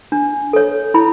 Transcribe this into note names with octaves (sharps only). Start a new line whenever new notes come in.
D4
A4 C#5
E4 B5